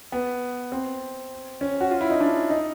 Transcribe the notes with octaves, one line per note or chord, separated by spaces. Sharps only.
B3
C4
C#4
F#4
F4
E4
D#4
D4
D#4